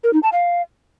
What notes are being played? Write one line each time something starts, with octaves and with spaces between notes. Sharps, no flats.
A#4
D#4
A5
F5